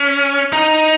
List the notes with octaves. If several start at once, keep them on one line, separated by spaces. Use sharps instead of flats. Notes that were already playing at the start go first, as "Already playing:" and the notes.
Already playing: C#4
D#4